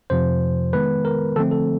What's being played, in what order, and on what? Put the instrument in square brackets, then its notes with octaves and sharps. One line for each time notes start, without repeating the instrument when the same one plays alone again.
[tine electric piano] F2 C3 F3 C5
D#3 G#3 B3 B4
A#4
D3 F3 A3 C4 A4
A4